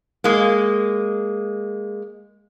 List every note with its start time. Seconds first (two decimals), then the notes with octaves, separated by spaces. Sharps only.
0.24 G#3 A#3